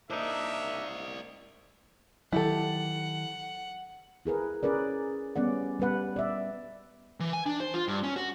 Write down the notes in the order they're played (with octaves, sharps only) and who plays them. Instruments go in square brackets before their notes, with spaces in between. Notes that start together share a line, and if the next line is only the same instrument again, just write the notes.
[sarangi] A#3 [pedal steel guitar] D4 D#4 [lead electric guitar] C5 D5 [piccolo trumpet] E5
[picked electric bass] D#3 F#3 [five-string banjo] E4 G4 A4 [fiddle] F#5
[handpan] E4 G#4 A#4 B4
C#4 G#4 A#4 B4 D5
G3 B3 C#4 D5 F#5
G3 B3 B4 F#5
D5 E5
[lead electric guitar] E3
G#5
D4
C5
F4
G2
C#4
F#4